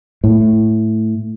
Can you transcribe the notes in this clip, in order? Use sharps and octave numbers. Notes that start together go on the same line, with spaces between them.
A2